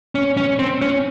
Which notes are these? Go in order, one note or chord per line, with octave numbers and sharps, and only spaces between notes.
C#4
C#4
C4
C#4